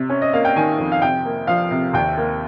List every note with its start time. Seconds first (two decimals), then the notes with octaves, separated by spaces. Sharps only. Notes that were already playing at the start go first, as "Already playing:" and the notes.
Already playing: C3
0.10 C#4
0.22 D#5
0.33 A#3 F5
0.45 G5
0.56 D#3 G#5
0.78 F2
0.92 F5
1.01 C3 G5
1.25 A#3
1.47 F3 F5
1.71 C3
1.93 D#2 G5
2.17 A#3